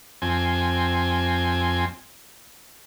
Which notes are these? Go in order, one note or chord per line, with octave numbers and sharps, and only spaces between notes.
F2 C4 G#5